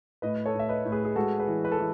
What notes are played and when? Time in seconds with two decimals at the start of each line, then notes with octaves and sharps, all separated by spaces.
0.22 A2 B4 D#5
0.46 A4 C#5
0.54 A2
0.59 E5
0.69 B4 D#5
0.85 A2
0.92 G#4 B4
1.05 G#4
1.16 G#3 F#4 A4
1.39 G#4 B4
1.47 E3
1.65 B4
1.72 A4
1.79 E3